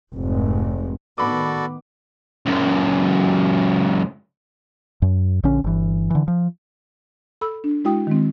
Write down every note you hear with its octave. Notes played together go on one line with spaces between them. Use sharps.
F1 G#2
A2 D#3 B3 F#4 A4 D5 B5 D6
C#2 F#2
F#2
A#1 D3 C#4
G1 E3
D3 E3
F3
A4 B5 E6
D4
G#3 E4 F#4 G5 D#6
D#3 G#3 C4